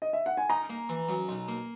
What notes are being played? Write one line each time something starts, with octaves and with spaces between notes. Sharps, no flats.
D#5
E5
F#5
G#5
D#4 A#5
A#3
E3
F#2
B1
A#3